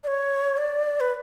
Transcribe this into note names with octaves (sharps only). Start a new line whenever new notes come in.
D5
C#5
D5
B4